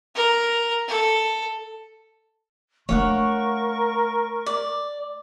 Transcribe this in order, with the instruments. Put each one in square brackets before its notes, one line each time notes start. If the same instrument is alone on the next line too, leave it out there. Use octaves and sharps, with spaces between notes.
[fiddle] A#4
A4
[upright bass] A3 D4 [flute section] A#4 C#6 [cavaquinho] C#5 F5 F#5
[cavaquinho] D5